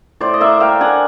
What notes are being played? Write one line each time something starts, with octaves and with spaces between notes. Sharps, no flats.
A2 C5 D5
D#5
A#3 D5 E5
A#3 F5 G5
D4 F#5 G#5